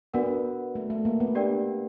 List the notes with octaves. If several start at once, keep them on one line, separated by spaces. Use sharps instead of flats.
B3 D4 F#4 A#4 D5 F#5
A3
A3
A#3
B3
D4 G4 A#4 D5 G5